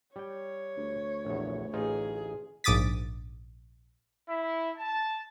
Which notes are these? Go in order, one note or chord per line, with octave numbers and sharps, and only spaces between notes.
G3 C#5 G5
D2
A#1 E2
A1 D#4 F4 G#4
A#1 G#2 D6 D#6 A6 B6
E4
A5